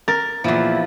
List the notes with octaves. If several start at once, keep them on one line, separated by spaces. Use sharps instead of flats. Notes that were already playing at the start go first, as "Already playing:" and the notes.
A#4 A6
E2 A#2 F3 E4